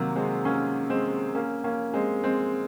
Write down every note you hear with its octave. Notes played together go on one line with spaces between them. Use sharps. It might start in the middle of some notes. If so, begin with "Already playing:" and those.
Already playing: C3 D#3 F#3 A#3
G#3 C4
A#3 C#4
G#3 C4
A#3 C#4
A#3 C#4
G#3 C4
G#3 C4